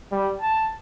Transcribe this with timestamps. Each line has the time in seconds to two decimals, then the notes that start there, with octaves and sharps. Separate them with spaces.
0.12 G3
0.41 A5